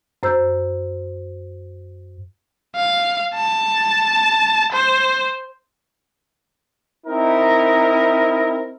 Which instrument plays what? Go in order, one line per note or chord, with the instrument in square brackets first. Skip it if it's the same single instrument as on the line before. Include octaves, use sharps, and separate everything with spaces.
[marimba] F#2 C5 E6 G6
[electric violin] F5
A5
C5
[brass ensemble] C4 D#4 E4 A#4